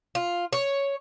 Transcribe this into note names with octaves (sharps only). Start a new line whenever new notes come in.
F4
C#5